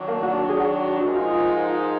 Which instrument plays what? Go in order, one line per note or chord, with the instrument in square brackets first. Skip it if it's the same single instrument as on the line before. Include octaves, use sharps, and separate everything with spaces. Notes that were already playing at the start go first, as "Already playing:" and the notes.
Already playing: [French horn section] D#3 F#3 D4
[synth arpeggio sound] A#3
F#4
F#4
G#4
F#4
[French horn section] G#2 F3 G#3 D#4 A#4 [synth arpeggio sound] F#4
[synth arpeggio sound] F4